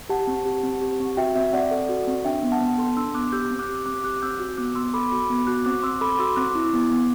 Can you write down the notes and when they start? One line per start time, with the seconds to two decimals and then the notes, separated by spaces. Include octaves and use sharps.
0.09 G4 F#5 A5
0.27 C4
0.45 G4
0.63 C4
0.81 G4
1.00 C4
1.17 F#4 E5 G5
1.35 C4 E5
1.53 C4 D5 F#5
1.71 A4
1.89 F#4
2.07 C4
2.25 D4 E5 G5
2.43 B3
2.52 F#5 A5
2.61 B3
2.78 A4 A5 C6
2.97 D4 C6 E6
3.15 B3 D6 F#6
3.32 G4 E6 G6
3.51 C4
3.59 D6 F#6
3.69 G4
3.86 C4 D6 F#6
4.04 G4 D6 F#6
4.22 C4 E6 G6
4.39 F#4
4.57 B3 D6 F#6
4.75 B3 C6 E6
4.94 A4 B5 D6
5.12 F#4 B5 D6
5.30 B3
5.47 F#4 D6 F#6
5.65 C4 D6 F#6
5.83 C4 C6 E6
6.01 A4 B5 D6
6.19 F#4 C6 E6
6.36 C4 D6 F#6
6.55 E4
6.73 B3
6.91 B3